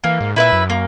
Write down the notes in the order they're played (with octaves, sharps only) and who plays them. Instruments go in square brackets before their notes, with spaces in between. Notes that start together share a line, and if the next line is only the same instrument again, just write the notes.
[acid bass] E3 [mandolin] A#3
[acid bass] G#2
[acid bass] A#2 [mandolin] E4 B4 E5
[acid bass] F#2
[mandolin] A#3